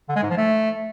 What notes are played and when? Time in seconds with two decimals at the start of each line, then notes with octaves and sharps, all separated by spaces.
0.09 D3
0.16 G#3
0.23 G#2
0.30 F3
0.37 A3